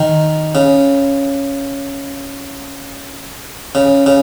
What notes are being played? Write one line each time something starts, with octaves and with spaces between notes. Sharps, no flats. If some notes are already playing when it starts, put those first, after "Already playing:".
Already playing: D#3
C#3
C#3
C#3